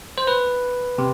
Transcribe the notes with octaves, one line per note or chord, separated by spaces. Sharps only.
C5
B4
C3